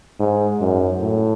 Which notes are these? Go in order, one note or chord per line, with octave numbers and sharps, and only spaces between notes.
G#2
F#2
A2